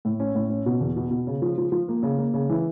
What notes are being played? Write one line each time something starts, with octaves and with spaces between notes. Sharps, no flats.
A2
C#4
A2
C#4
B2
E2
B2
B2
C#3
F3
F3
F3
A#3
C#3
A#3
C#3
E3